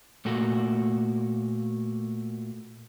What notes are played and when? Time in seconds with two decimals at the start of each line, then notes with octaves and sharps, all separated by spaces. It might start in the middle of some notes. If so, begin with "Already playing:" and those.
0.25 A#2 A3 A#3 F#4